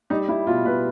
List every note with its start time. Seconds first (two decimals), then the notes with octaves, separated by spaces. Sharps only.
0.10 G3 D#4
0.28 G3 E4
0.47 B2 F4
0.65 B2 B4